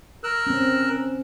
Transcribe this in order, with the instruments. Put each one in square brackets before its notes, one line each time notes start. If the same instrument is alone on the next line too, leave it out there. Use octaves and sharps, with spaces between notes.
[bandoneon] A#4 E6 F#6
[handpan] C4 C#4